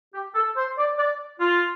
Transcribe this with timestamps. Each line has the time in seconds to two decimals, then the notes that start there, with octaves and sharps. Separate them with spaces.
0.14 G4
0.35 A4
0.56 C5
0.77 D5
0.98 D5
1.40 F4